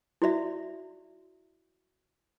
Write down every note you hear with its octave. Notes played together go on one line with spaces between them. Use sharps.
E4 F#4 D5 E5